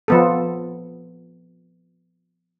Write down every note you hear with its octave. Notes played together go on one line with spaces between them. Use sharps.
F3 B3 A4